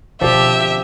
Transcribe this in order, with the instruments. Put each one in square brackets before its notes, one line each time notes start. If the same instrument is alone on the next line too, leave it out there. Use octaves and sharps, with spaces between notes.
[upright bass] B2 D3 [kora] F3 C4 D4 [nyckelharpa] G4 [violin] E5